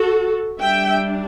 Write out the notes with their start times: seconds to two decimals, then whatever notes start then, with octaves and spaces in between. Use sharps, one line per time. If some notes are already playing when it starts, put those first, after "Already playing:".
Already playing: F#4 A4
0.59 G3 D4 E5 G5